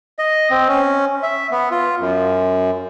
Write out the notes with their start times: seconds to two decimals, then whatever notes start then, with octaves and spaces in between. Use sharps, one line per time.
0.19 D#5
0.51 C4
0.68 C#4
1.23 E5
1.51 B3
1.71 F4
2.00 F#2